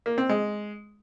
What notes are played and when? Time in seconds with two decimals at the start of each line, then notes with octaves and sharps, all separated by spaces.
0.06 A#3
0.18 C4
0.29 G#3